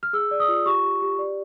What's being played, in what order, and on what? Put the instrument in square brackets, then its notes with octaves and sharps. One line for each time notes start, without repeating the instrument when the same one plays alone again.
[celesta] F6
G#4 E6
D5
D#6
F4
G4 C#6
G4
G4
D5